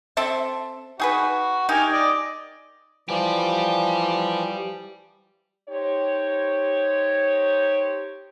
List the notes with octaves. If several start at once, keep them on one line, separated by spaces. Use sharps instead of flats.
C4 A4 E5
D#4 F#4 G#4 B4
D#4 G4 A#4 G#5
D5 D#5
E3 F3 G4 D5
D#4 G4 C5 C#5